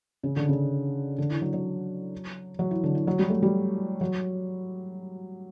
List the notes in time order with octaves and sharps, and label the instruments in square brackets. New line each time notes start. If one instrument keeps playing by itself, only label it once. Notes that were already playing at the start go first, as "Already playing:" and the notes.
[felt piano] C#3
D3
C#3
D3
E3
F#3
F#3
F#3
E3
D3
E3
F#3
G3
A3
G3
F#3